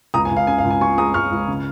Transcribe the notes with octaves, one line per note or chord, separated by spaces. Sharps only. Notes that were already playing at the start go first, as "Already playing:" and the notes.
C#2 A#5 D#6
G#5
C#2
F5
C#3 G#5
F5
C#2
G#5
F4 G#5 C#6
G#3 A#5 D#6
C#2 C#6 F6
C#2
C#3